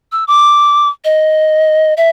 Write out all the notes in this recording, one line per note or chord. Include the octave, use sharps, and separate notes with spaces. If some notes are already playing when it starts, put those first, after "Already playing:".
E6
D6
D#5
E5